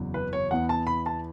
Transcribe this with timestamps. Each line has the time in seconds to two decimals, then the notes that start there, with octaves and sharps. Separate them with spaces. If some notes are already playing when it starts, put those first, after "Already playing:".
Already playing: F#1 E2 C#3 F#3
0.14 B4
0.33 C#5
0.51 E2 E3 B3 F#5
0.69 A5
0.87 B5
1.06 A5